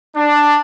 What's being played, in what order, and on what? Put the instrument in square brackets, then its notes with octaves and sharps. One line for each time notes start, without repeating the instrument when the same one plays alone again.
[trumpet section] D4